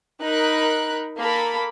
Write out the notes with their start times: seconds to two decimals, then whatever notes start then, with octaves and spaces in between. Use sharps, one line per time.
0.22 D#4 A#4 B5 F#6
1.18 A#3 A4 A#4 B5